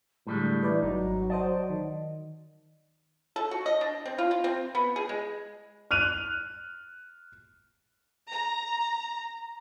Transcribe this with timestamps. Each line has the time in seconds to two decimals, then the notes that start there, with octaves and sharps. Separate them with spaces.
0.27 A2 D3 G3 G#3
0.63 E3 B4 D5
0.83 G#1 F#3 D#4
1.30 C5 D5 D#5 A5
1.70 D#3
3.36 A4
3.51 F#4
3.66 D#5
3.81 D4
4.05 C4
4.18 F4
4.31 F4
4.44 C4
4.75 B3
4.96 G#4
5.09 G#3
5.91 F6 F#6 D#7 F7
8.29 A#5